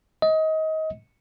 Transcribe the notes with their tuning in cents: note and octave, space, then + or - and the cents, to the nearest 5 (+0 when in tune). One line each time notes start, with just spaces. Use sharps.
D#5 +25